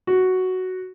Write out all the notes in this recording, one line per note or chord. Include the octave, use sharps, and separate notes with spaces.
F#4